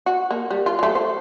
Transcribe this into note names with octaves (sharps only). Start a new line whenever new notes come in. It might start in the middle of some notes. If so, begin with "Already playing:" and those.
F#4
A#3
G3
F4
F#3 A3
C5